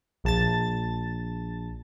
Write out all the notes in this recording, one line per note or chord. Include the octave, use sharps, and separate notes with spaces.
A#1 A5 A6